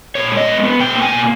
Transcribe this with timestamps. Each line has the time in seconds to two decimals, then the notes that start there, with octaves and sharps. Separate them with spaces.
0.15 A#2 C#5
0.32 G#3
0.37 D#5
0.48 B3
0.64 B3
0.80 B2 G5
0.96 A#3
1.02 G#5
1.12 B2